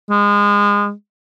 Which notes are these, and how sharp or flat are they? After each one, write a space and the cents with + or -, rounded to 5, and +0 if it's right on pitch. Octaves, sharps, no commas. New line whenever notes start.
G#3 -25